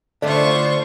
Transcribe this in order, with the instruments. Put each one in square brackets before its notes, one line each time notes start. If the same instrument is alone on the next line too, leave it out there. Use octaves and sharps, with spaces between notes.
[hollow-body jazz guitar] D3 A3 D4 [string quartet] F4 C5 C#6 [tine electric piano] D5